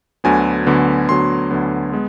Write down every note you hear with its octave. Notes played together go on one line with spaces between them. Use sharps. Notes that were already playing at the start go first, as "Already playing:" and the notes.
D2 D3 F#3 B3 G#5
D2 D3 F#3 B3
D2 D3 F#3 B3 C6
D2 D3 F#3 B3
G#3 B3